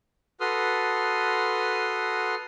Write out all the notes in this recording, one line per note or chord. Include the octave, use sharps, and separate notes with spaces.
F#4 A4 B4 C6 D#6 F6